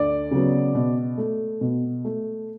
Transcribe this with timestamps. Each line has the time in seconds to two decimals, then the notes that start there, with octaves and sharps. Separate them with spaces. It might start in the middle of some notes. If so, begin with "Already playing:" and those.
Already playing: D2 D5
0.31 C#3 F#3 B3
0.75 B2
1.18 A3
1.61 B2
2.05 A3